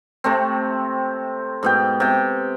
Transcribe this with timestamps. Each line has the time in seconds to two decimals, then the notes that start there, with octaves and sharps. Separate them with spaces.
0.24 C3 A3 C4
1.63 G#2 B2 G5
2.00 C3 G5